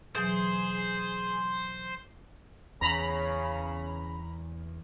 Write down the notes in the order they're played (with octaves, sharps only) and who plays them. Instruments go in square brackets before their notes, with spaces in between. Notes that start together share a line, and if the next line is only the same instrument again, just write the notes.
[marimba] B2 E3 F#3 [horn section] G#4 [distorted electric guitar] C5
[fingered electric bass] E2 E3 [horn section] C#3 [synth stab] A#5 B5